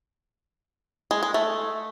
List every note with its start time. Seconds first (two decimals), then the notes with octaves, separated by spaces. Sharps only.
1.11 G#3
1.23 G#3
1.34 A3